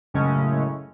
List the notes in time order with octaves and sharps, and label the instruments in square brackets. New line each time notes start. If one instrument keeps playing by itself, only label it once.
[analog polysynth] F#2 A2 C#3 G#3 A3 C#4